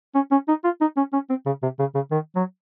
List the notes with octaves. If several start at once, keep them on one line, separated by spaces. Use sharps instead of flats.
C#4
C#4
D#4
F4
D#4
C#4
C#4
C4
C#3
C3
C#3
C#3
D#3
F#3